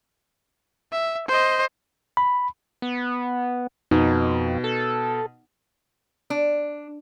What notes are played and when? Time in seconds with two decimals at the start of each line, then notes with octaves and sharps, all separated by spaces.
0.92 E5
1.28 C5 D#5
2.17 B5
2.82 B3
3.91 F2 B2 D#4
4.64 A4
6.30 D4